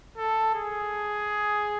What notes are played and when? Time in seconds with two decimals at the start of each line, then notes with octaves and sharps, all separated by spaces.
0.17 A4
0.55 G#4